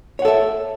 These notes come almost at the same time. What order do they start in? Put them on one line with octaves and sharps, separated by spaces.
C#5 F#5 A4 E5